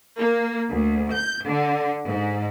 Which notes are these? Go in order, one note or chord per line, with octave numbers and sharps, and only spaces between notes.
A#3
D2
G6
D3
G#2